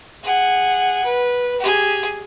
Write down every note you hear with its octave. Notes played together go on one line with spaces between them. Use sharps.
G#4 F#5
B4
G4 G#4